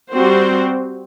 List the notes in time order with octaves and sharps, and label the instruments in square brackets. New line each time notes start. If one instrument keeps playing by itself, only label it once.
[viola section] G3 C4 F#4 C5